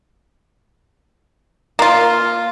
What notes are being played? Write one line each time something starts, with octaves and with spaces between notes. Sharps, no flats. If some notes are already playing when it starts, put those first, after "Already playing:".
A#3 F4